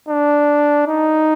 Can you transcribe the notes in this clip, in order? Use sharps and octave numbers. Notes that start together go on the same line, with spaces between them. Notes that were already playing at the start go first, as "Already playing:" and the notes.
D4
D#4